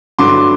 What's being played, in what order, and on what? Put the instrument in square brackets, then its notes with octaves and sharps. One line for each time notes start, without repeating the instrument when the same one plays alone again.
[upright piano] G2 D3 F#3 A3 C6 D6